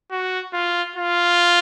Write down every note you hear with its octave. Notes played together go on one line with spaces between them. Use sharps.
F#4
F4
F4